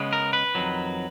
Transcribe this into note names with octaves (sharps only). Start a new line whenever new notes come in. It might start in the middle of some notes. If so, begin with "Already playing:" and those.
Already playing: C#3 G#3 B3
A#4
B4
F2 D#3 F#3